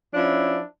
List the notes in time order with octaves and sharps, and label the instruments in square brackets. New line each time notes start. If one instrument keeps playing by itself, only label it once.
[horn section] F3 C#4 D4 E4